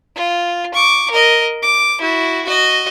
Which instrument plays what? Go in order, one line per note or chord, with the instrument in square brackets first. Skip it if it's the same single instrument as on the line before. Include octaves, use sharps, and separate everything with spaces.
[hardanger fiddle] F4
C#6 D6
A#4 D#5
D6
E4 F#4
F#4 D#5